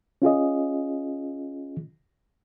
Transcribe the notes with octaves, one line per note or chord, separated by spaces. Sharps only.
C#4 F4 G#4 D#5